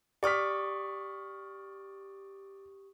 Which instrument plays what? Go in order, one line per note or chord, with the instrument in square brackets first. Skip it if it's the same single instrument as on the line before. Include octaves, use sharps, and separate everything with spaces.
[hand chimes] G4 C#6 D#6 [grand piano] D5 F6 B6